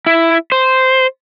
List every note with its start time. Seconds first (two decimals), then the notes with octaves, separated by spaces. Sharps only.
0.06 E4
0.52 C5